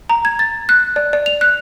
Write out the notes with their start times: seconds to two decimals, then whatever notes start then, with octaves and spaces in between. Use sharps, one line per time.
0.10 A#5
0.25 G#6
0.39 A6
0.69 F#6
0.96 D5
1.13 D5
1.26 F7
1.41 F#6